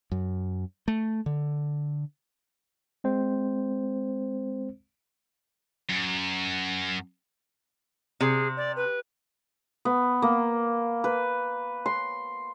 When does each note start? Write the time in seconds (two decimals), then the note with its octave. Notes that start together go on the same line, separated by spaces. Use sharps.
0.12 F#2
0.88 A3
1.26 D3
3.04 G#3 C4 C5
5.90 F#2
8.21 C3 G#4
8.57 D5
8.76 B4
9.85 B3
10.22 A#3
11.04 B4
11.86 C6